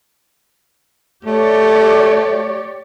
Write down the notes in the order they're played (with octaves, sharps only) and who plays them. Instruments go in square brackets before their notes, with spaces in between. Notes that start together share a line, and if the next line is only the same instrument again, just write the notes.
[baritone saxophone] A3 [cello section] G4 C#5 D5